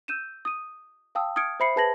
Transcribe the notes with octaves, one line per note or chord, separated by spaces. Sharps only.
E6 G6 D#7 E7
D#6 D#7
F5 G5 A5 D#6 E6
D#6 F6 G#6 C#7 D7
C5 E5 B5 C7 C#7
G#4 B4 A5 G#6 A#6 F#7